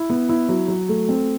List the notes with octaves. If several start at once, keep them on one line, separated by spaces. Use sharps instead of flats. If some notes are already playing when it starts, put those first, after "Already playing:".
Already playing: E4
B3
E4
F#3
F#3
A3
C4